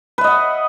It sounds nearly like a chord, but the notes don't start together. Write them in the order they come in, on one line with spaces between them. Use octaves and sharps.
B4 E5 D#5 F#5